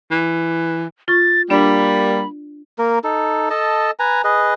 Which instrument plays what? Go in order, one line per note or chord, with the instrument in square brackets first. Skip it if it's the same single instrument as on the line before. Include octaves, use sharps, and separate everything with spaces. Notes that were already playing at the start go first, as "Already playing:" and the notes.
[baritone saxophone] E3
[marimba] F4 C#6 [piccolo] A6
[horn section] G3 A#3 [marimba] D4 D5 [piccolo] B5
[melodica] A#3 A#4
D#4 A4
A4 D#5 A5
B4 G#5 A#5
G#4 B4 D#5